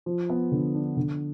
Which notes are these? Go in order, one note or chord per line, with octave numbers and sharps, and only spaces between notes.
F3
B3
D3
D4
D3